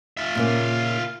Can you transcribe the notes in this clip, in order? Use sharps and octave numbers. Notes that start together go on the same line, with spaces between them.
F4 E5
A#2 C#3 A#3